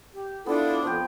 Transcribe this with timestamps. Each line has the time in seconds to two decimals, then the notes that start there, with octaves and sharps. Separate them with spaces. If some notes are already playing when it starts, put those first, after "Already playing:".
0.13 G4
0.46 B3 D4 E4 F4 A4
0.82 F2 F3 B3 G5